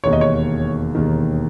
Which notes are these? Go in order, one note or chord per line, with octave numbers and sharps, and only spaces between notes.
E1 D#2 D#3 C#5
D#5
C#5
E1 D#2 D#3